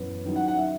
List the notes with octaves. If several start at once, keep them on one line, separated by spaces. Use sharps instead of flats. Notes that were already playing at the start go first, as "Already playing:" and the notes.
Already playing: F#2 E3 B3
D#3 F#3 C#4 E4
F#5
F#5
E5